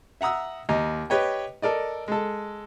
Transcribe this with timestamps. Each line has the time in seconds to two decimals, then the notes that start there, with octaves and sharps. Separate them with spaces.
0.21 E5 F#5 A#5 D#6 E6
0.69 D#2 D#5 A#5
1.10 G4 B4 C#5 D#5 G5
1.62 A4 A#4 D5 D#5
2.08 G#3 A4